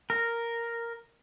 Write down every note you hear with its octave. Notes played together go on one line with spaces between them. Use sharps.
A#4